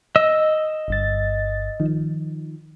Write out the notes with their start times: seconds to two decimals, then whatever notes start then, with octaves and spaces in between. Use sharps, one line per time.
0.16 D#5 E6
0.88 G1 G2 A6
1.80 D#3 F3